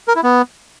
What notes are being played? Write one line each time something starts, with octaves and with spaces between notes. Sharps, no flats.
A#4
E4
B3